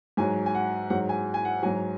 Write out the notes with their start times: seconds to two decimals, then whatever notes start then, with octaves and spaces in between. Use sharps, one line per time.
0.17 G#2 F#3 G#5
0.46 G#5
0.55 F#5
0.90 G#2 F#3 F#5
1.09 G#5
1.34 G#5
1.45 F#5
1.63 G#2 F#3 G#5